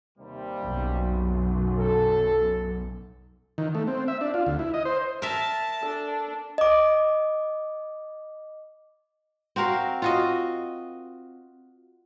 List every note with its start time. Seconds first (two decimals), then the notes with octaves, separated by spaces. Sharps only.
0.18 D#2 C3 G3
0.61 B1 F#2
1.78 A4
3.58 D#3
3.75 A3
3.87 C4
4.08 E5
4.21 D4
4.34 F4
4.46 D2
4.59 E4
4.74 D#5
4.85 C5
5.22 A#4 E5 A5
5.83 D4 A4
6.58 D#5 D6
9.56 C4 F#4 A#4 F5
10.02 F4 F#4 D#5